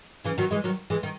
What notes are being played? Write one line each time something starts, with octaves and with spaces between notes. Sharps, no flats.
C#3 E3
D#3 F#3
E3 G#3
D#3 F#3
E3 G#3
D#3